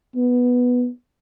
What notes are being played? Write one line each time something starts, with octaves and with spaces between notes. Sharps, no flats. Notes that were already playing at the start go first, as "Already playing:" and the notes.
B3